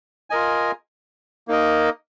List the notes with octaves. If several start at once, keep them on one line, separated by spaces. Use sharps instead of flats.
F4 A#4 D#5 G#5
A#3 D#4 A#4 D#5